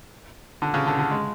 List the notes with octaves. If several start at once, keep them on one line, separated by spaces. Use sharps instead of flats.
D3
C#3
D3
D3
G#3